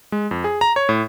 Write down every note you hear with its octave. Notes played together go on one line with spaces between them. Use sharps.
G#3
F2
G#4
A#5
C#5
A2